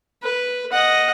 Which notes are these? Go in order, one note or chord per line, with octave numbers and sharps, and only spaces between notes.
B4
D#5 F#5